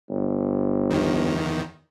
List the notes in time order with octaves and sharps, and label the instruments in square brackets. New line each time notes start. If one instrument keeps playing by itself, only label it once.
[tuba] G1
[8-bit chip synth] E2 D#3